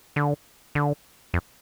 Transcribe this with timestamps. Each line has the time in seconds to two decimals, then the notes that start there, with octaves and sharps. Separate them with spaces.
0.16 D3
0.75 D3
1.34 F2